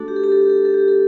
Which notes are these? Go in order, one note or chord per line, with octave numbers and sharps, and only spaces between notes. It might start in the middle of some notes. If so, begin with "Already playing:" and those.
Already playing: A3 D4 F#4 A4
G4
A4
G4
A4
G4
A4
G4
A4
G4
A4